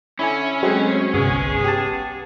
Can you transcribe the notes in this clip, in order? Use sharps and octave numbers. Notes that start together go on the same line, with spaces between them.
D3 C#4 E4 G#5 B5
B2 F#3 G#3 A3 C4 G#4
G1 C2 G#3 B3 G#4
G4 A5